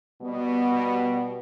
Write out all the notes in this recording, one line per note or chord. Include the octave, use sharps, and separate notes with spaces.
B2 G3 B3